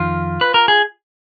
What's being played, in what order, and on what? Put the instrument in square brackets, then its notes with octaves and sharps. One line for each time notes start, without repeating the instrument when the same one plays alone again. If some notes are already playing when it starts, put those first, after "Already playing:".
Already playing: [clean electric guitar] F2 D#3 F4
B4
A#4
G#4